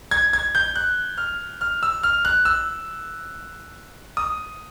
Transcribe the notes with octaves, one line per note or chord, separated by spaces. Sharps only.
G#6
G#6
G6
F#6
F6
F6
E6
F6
F#6
E6
D#6